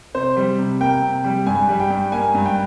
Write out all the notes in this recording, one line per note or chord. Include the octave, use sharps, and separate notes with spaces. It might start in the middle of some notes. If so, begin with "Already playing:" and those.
C3 C5
G3
C3
A#3 G5
C3
G3
G2 G#5
G3
G5
G2
A#3 G#5
G2
G5